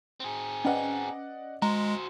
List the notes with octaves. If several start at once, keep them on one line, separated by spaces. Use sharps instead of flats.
C4 G#4
C#4 B4 D5 D#5 F#5
G#3 F#4 C5 A#5